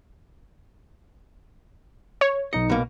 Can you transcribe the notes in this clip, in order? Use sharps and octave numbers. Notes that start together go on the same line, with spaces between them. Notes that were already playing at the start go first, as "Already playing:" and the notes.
C#5
B1 D#4 D#5 C#7
B2 A#3